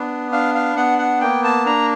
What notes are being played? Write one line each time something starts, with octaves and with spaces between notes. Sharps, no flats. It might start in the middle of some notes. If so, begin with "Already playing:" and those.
Already playing: B3 D4
D4 F5
F5
B3 F#5
F#5
A#3 G5
A5
D4 A#5